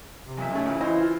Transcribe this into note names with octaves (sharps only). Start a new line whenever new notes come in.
C3
B1 A#2 E5
G#3 A3 C#4
A#2 C#3 E3
E3 E4 C5 D#5
F4